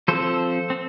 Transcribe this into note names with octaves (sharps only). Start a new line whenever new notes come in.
F3 C4 A4 C5
C4